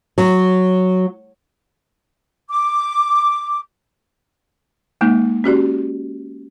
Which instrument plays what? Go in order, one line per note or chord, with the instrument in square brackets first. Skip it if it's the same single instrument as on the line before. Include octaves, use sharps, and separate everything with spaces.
[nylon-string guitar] F#3
[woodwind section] D6
[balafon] G#3 A#3 D#4
C#4 F#4 G4 D5